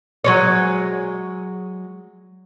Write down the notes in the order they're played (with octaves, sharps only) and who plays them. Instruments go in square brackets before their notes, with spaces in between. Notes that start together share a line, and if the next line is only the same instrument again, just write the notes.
[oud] F#3 G#3 C#5